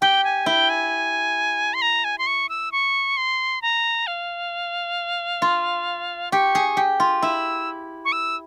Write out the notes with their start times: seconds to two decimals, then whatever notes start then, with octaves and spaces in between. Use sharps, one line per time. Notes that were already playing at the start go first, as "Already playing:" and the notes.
0.01 G4 G5
0.24 G#5
0.46 E4 G5
0.69 G#5
1.74 C6
1.82 A#5
2.04 G#5
2.18 C6
2.27 C#6
2.49 E6
2.72 C#6
3.17 C6
3.62 A#5
4.07 F5
5.42 F4
6.32 G4 C#6
6.55 G#4
6.77 G4
7.00 F4
7.22 E4 E6
8.05 C#6
8.12 E6